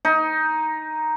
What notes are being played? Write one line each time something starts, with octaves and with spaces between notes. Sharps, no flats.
D#4